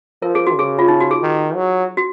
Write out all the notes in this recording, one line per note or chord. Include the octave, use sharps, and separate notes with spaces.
F3 A#4
G#4
F#4
C#3 G#4
F4
D#4
F#4
G#4
D#3
F#3
F#4